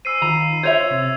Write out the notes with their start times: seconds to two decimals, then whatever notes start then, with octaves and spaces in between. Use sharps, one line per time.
0.05 C5 G#5 B5 E6 C7 D#7
0.22 D#3 F4 A#5 B5
0.63 F4 C5 C#5 E5 G#6 F7
0.90 C3 C4 A6